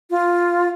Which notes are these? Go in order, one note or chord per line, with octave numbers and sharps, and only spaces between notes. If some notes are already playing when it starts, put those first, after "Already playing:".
F4